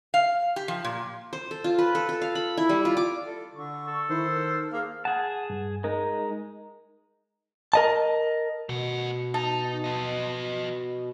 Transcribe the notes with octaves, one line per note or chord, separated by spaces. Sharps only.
F5
G4
F3
A#2
C5
A4
F4
B4
A4
A4
F5
B5
E4
G3
F4
D6
A4
D3 C#6
A4
D#3 E4 C5
A#4
A#3 G#4 F5
G#4 F#5 A5
G2
G#3 D#4 A#4
A#4 D#5 A5
B2 A3 F#5
D#4 A5
F3 D#5